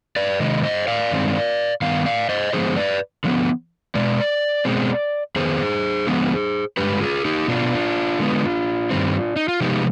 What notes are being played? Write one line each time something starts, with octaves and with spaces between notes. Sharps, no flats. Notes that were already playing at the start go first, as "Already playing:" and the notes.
B4 D5
C3 D#3 G#3 D#5
C5 D#5
D5 F5
G2 D#3 G#3 C4
G2 D#3 B3 F5
D5 F5
C5 D#5
D3 F3 G#3 B3 G#4 C5
B4 D5
D3 F3 B3
B2 G#3 D5
B2 G#3 C4
F2 D#3 B3 G#4 C5
D3 F3 G#3 B3
G2 D3 G#3 G4 B4
F4 G#4
D#4 G4
B2 B3 D4 F4
D3 G#3 B3
G2 D#3 G3 C4
D#4
F4
C3 F3 G#3 B3 D#4 G4